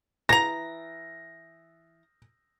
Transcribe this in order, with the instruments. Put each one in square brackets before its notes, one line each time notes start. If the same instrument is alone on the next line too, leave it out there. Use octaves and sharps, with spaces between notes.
[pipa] E3 A#5 [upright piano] A#6